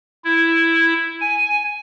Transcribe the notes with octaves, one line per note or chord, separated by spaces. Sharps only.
E4
G#5